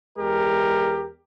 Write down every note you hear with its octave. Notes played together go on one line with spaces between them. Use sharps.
E2 G#3 G4 A#4